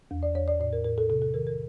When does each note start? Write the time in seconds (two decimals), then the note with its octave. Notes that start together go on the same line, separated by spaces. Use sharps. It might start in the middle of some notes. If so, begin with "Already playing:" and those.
0.11 E2
0.23 D5
0.35 E2 C#5
0.48 D5
0.60 A2 D5
0.73 A#4
0.84 A2 A#4
0.98 A4
1.10 C3 A4
1.22 A4
1.34 D#3 A#4
1.47 A#4